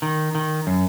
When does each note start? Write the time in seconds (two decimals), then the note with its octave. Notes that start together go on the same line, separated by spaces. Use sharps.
0.02 D#3
0.35 D#3
0.67 F#2